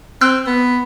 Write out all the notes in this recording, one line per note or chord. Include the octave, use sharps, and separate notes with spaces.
C4 E6 F#6
B3